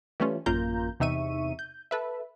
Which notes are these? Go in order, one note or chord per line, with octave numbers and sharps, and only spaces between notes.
E3 G3 A3 C#4 F4
A1 F#2 A#3 F4 A#5 G6
E2 C3 D#4 E5 C#6 D#7
G6
A4 B4 E5